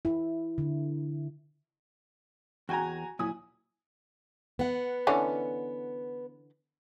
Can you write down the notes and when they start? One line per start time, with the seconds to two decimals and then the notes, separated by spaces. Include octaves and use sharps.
0.05 E4
0.58 D3
2.69 E2 F#4 G5 G#5 A#5
3.19 A#2 F#3 E4 G#5 D#6
4.59 B3 F#5
5.07 D3 E3 C#4